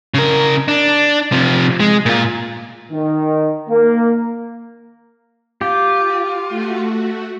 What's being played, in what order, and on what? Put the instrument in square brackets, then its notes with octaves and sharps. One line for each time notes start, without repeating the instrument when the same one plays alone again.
[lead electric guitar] C#3 A#4
D4
C3 F3
G#3
A#2 F4
[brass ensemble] D#3
A#3
[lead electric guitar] F4 [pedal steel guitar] G4
[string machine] A3 F#4